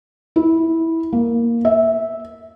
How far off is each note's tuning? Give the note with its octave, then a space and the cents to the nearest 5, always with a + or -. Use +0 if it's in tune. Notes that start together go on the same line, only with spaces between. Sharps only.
E4 -15
A#3 +0
E5 -10